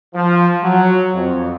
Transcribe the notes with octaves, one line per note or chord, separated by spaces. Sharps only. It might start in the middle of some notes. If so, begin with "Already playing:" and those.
F3
F#3
F2